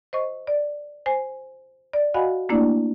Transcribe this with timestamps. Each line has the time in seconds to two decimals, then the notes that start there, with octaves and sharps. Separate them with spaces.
0.13 C5 D#5 C#6
0.47 D5
1.06 C5 G#5
1.93 D5
2.14 F#4 D#5 F5 F#5 G#5 B5
2.49 A3 A#3 D4 E4 D5